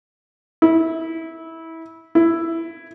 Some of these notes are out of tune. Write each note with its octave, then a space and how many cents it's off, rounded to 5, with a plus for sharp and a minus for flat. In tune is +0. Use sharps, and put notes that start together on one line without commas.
E4 -20
E4 +5